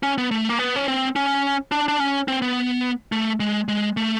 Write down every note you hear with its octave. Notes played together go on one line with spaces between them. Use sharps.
C#4
B3
A3
A#3
B3
C#4
C4
C#4
D4
D4
C#4
C4
B3
A3
G#3
G#3
A3